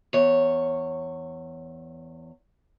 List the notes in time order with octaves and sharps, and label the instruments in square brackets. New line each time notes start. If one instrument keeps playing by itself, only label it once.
[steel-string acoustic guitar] E2 C#5